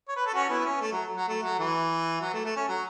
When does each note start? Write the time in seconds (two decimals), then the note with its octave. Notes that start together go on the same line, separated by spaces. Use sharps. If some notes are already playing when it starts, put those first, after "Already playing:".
0.08 C#5
0.16 B4
0.26 A4
0.34 C#4 F#4
0.49 B3 E4
0.60 B3
0.65 C#4
0.81 A3
0.92 F#3
1.16 F#3
1.28 A3
1.43 F#3
1.59 E3
2.21 F#3
2.34 A3
2.45 A3
2.56 C#4
2.69 F#3